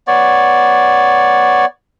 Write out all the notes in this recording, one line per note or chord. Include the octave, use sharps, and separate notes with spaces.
B3 C#5 D5